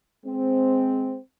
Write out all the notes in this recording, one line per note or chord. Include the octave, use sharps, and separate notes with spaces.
G#3 C4